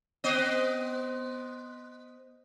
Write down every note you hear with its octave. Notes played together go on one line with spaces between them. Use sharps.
B3 C5 D#5